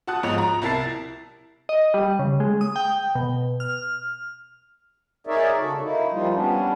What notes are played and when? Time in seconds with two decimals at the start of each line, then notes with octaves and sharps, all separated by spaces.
0.07 F#4 F#5 A5 D#6 F#6
0.23 G#2 F3 C#5 D#6 F7
0.38 A#5
0.62 C2 E4 A#4 A5 A6 C7
1.69 D#5
1.94 G3
2.19 C#3
2.40 G#3
2.61 D#6
2.76 G5
3.15 B2
3.60 F6
5.27 D#4 G#4 A#4 C#5 D5 E5
5.60 C#3 F#4 A4
5.80 A#3 D#4 E4
6.11 F3 G3 A#3 D#4 F4
6.33 G3 B3 C#4 D4